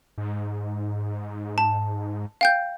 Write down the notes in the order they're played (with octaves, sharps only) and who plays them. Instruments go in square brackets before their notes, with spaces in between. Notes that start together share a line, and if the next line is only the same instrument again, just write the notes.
[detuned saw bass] G#2
[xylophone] A5
F5 G5 G6